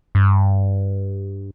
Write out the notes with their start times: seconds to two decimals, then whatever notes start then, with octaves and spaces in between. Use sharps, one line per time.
0.15 G2